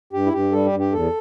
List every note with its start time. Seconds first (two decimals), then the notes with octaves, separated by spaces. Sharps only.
0.13 G2 G4
0.26 E4
0.33 G2 G4
0.52 G3 A4
0.66 G4
0.72 G2
0.79 G4
0.92 E2 A4